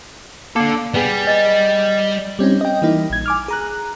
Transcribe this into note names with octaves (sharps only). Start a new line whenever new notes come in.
A#3 D4 A4
G3 B3 G#4
D#5 A6
G3 C4 C#4 D#4
D#5 G5
E3 G3 A#3 D#4 E4
A#1 G#6
G#5 D6 F6
G#4 A#5 F#6